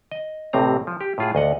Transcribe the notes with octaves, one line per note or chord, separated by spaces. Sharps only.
D#5
A1 A2 C3 C4 A#5
F3
G4
A2 F4 G#4
D2 D#5 F#5